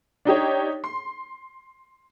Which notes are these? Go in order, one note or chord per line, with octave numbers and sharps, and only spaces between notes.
D4 D#4 G4 C#5
C6